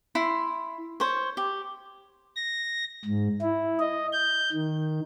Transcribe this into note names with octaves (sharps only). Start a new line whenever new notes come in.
E4 C6
C5 C#5
G4
A#6
G#2
E4
D#5
G6
D#3